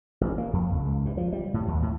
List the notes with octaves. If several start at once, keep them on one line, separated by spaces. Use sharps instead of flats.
A1
A#3
F2
C#2
C#2
G2
F3
G3
A2
D#2
A2